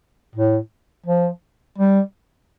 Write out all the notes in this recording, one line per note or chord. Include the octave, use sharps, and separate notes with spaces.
A2
F3
G3